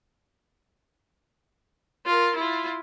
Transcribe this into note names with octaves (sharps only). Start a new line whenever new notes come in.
F4 A#4
E4 F4